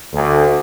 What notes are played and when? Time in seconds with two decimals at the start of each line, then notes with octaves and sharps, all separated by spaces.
0.13 D2